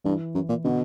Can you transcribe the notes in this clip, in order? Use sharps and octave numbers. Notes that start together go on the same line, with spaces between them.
G2 E3
F#2
A#2
B2 D3